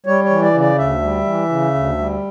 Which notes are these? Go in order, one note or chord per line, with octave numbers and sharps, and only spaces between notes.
G3 C#5
C#5
E3
D5
C#3
D5
D2 E5
G3
E3
C#3
D2
G3